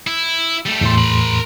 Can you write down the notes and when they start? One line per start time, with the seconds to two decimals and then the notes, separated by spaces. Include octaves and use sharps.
0.07 E4
0.66 G3 A3
0.81 E2 A2 C6
0.98 A#4 B5